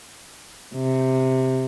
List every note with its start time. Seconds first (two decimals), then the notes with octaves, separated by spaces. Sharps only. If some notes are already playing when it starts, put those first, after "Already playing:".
0.75 C3